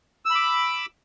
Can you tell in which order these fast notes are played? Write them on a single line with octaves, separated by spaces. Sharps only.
E6 B5 D6